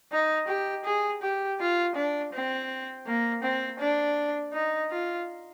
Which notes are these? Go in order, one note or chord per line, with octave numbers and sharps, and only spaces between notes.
D#4
G4
G#4
G4
F4
D4
C4
A#3
C4
D4
D#4
F4